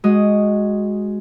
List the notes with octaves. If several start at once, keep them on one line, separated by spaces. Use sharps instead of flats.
G#3 F#4 D#6